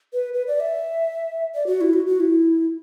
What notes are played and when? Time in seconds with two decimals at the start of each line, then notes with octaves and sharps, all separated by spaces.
0.13 B4
0.34 B4
0.47 D5
0.60 E5
1.55 D5
1.67 F#4
1.81 E4
1.93 F#4
2.07 F#4
2.20 E4